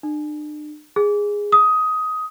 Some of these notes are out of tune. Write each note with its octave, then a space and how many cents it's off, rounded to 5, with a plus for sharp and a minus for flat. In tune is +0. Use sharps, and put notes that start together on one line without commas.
D4 +40
G#4 -10
D#6 +15